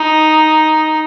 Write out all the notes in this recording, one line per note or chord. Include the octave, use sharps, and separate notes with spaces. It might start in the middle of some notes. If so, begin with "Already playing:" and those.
Already playing: D#4